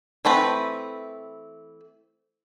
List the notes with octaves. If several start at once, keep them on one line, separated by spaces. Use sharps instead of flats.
E3 A3 C4 B4